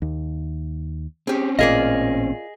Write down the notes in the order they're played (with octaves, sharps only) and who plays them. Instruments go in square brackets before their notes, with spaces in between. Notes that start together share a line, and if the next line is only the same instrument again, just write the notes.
[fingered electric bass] D#2
[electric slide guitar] C4 C#4 [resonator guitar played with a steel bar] G4 G#4
[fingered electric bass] A1 A#2 [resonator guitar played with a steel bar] F4 A#4 D5 [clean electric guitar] G#4 D#5